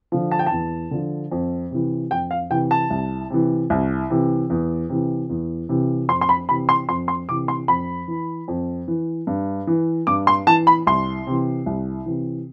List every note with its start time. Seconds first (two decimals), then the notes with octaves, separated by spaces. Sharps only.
0.12 D3 F3
0.31 A5
0.39 G5
0.47 E2 A5
0.91 D3 F3
1.32 F2
1.71 C3 E3
2.11 F2 G5
2.31 F5
2.50 C3 E3 G5
2.71 A5
2.90 C2
3.30 C3 E3
3.70 C2
4.10 C3 E3
4.50 E2
4.89 C3 E3
5.30 E2
5.69 C3 E3
6.09 F2 C6
6.21 C6
6.29 B5
6.49 C3 E3 B5
6.69 C6
6.89 F2 C6
7.08 C6
7.28 C3 E3 D6
7.48 C6
7.68 F2 B5
8.08 E3
8.48 F2
8.88 E3
9.27 G2
9.67 E3
10.07 G2 D6
10.27 C6
10.47 E3 A5
10.67 B5
10.87 C2 C6
11.27 C3 E3
11.66 C2
12.06 C3 E3